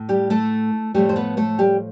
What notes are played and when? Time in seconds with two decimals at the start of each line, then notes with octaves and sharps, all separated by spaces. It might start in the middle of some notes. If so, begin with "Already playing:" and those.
Already playing: A2
0.09 G3 G4
0.30 A3 A4
0.94 A2 F3 G3 A3 G4
1.09 C5
1.16 B3 B4
1.37 A3 A4
1.59 G3 G4